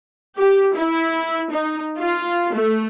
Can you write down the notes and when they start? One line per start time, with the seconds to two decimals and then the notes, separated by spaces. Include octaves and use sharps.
0.38 G4
0.76 E4
1.52 D#4
1.99 F4
2.54 A3